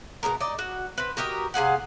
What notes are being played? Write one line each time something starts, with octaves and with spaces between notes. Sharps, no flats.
B2 D3 G#3 A#4
D#4 D5 D#5
F#4
C4 B4
F#4 G4 A#4 D#5
C3 G#4 F5 F#5